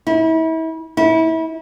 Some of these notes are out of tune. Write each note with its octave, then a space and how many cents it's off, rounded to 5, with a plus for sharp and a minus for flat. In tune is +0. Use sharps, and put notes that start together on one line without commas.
E4 -35
E4 -30